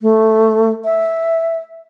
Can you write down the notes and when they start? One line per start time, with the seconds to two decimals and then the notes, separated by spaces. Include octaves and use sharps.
0.02 A3
0.85 E5